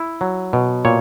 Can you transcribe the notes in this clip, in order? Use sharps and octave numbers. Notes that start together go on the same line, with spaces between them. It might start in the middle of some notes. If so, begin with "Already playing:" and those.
Already playing: E4
F#3
B2
A#2 C#5